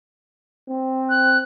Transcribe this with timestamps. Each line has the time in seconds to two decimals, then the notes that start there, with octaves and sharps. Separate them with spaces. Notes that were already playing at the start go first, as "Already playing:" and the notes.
0.68 C4
1.09 F#6